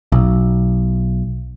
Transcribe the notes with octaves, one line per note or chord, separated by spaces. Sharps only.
B1